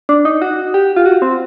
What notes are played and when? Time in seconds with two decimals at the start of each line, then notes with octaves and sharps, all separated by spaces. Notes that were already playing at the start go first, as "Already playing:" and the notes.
0.09 D4
0.25 D#4
0.42 F#4
0.74 G4
0.96 F4
1.06 F#4
1.22 C4